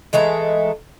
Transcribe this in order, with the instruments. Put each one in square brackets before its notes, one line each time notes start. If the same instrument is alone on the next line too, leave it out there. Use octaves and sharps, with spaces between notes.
[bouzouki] E3 G#3 A3 A#5